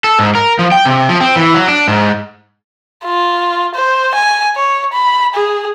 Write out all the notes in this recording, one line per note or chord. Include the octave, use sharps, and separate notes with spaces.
A4
G#2
A#4
F3
G5
C3
F3
C4
E3
F#3
D4
G#2
F4
C5
G#5
C#5
B5
G#4